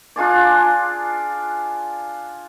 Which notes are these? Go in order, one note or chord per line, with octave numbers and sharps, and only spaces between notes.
D4 F4 G#4 D5